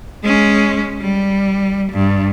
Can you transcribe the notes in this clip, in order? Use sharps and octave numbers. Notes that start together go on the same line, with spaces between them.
G#3 C#4
G3
G2